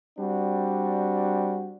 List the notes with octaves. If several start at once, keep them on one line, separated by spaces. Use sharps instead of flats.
G3 C4 D4 F#4